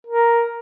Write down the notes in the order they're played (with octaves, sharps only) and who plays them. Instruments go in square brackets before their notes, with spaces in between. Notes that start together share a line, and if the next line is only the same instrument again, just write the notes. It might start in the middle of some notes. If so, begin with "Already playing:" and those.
[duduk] A#4